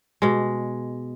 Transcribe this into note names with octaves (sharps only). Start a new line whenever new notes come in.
B2 G#3